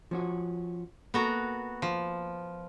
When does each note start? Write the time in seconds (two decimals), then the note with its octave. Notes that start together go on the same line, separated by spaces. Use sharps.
0.11 F3 C#4 F#4
1.14 A#3 B3 F#4 A4 A#4 A#5
1.82 F3